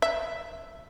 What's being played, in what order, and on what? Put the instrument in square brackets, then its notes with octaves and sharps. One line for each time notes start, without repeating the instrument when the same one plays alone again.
[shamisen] E5